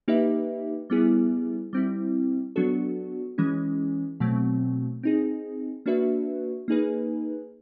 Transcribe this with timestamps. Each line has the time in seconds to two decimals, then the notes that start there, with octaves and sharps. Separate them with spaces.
0.08 A#3 D#4 G4 B4 E5
0.90 G3 B3 E4 G#4
1.73 G3 C4 E4
2.56 F#3 B3 D4 F#4 A4
3.38 E3 G#3 C#4
4.20 B2 F#3 A3 C4
5.03 C4 D#4 G#4
5.86 A#3 D4 F#4 B4 E5
6.68 A#3 D#4 G#4 B4